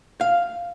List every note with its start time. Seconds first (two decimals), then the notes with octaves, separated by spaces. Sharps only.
0.21 F5